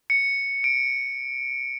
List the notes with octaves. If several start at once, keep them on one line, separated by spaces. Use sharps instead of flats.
C#7
D7